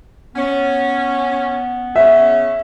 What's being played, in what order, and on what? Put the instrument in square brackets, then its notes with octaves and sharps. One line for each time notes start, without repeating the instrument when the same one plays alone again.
[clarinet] B3 [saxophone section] C#4
[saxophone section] C#3 C#4 [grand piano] E5